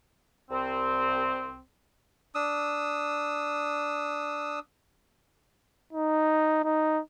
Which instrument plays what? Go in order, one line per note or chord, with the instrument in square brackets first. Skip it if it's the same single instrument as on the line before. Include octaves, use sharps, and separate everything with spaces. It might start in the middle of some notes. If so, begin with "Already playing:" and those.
[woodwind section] C2 C4
[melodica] D4 D#6 E6
[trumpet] D#4
D#4